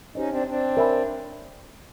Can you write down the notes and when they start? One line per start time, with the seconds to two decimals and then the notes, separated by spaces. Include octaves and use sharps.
0.15 C#4 D#4 G4 C5 D#5
0.30 C4 D4
0.47 C4 D4
0.77 A#4 C#5 E5 G#5 B5